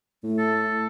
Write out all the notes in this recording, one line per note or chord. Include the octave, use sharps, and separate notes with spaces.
A2 A3
A4